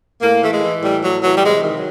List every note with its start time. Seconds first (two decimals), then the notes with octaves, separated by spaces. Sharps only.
0.22 A2 A#3
0.41 E3 A3
0.52 G#3
0.63 E3
0.82 A2 G3
1.03 A2 F#3
1.22 E3 F#3
1.37 G3
1.43 C3 G#3
1.63 D#3
1.74 F#3